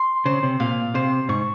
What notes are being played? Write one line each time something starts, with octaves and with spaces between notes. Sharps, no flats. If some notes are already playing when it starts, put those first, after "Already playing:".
Already playing: C6
C#3 C5
C3
A#2 F5
C3 C5
G#2 C#6